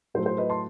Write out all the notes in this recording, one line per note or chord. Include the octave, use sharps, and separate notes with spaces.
A2 F#3 A3 C5
C5
B4 D#5
A5 C6